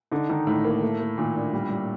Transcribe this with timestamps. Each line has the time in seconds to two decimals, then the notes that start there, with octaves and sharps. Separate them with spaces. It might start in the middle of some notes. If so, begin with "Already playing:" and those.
0.11 D3 D#4
0.29 D#3 D#4
0.47 A2 D#4
0.64 A#3
0.83 A3
1.00 A3
1.18 A#2 D#3
1.36 D4
1.53 G3
1.71 G3